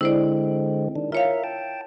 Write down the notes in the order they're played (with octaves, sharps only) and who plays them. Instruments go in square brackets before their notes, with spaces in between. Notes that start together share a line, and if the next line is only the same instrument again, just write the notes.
[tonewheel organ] D3 G#3 C4 [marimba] E4 C5 D5
[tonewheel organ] D#3 D4
[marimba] F4 C#5 F5 [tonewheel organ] A#4 E5
[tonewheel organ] G5 A5